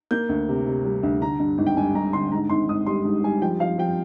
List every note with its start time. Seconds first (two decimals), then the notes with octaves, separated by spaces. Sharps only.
0.11 A#3 G6
0.29 D2
0.48 C3
0.67 C3
0.85 G3
1.03 D2
1.21 D3 A#5
1.40 G2
1.58 G#1
1.66 G5
1.77 G2 G#5
1.95 G2 A#5
2.13 D3 C6
2.32 G#2 A#5
2.49 G#1 C6
2.69 G#1 D#6
2.86 G3 C6
3.05 G#2
3.24 G3 G#5
3.41 F3 G5
3.60 F3 F5
3.78 F3 G5